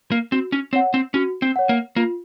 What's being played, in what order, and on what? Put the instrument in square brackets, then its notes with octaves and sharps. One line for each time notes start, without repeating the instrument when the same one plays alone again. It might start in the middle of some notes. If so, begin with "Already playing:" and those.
[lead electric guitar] A#3
[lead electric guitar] C4 [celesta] F#4
[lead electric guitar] C#4
[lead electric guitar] C4 [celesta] C#5 F#5
[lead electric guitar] C4
[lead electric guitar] C#4 [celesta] F#4
[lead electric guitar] C4
[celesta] C#5 F#5
[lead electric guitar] A#3
[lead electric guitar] A#3 [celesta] F4